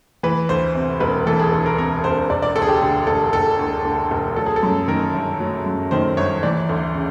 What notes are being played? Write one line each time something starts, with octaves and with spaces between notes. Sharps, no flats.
E3 B4
D2 C5
C3
E1 B4
E3 A4
G#4
D2 A4
A#4
C3 A#4
E1 C5
E1 D5
D5
D2 A4
G#4
G4
D3 G4
E1 A4
E1 A4
D2
D3
E1
F#3 A4
G#4
A4
F#2
D#3 A#4
G1
F#3
F#2
D#3 C5
G1 C#5
E3 D5
D2
C#3